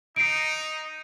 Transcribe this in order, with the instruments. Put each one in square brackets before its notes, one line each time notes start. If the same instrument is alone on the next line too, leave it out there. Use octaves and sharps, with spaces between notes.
[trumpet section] D#4 [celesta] C7 D7